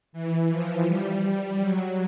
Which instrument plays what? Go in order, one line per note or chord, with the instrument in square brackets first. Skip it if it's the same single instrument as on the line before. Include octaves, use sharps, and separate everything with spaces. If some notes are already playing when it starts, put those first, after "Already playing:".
[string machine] E3
F3
G3
F#3